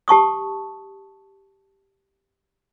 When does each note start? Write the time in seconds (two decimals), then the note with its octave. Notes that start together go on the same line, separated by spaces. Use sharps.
0.08 G4 A5 C#6 D#6